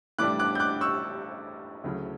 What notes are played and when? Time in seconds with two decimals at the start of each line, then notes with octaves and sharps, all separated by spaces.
0.19 A2 E3 G3 D4 D6 F#6
0.39 D6 F#6
0.55 G6
0.60 D6 F#6
0.81 C#6 E6
1.84 D2 C#3 F#3 A3 E4